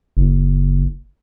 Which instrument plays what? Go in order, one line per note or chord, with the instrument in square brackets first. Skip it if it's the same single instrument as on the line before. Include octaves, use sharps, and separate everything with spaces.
[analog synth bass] F#1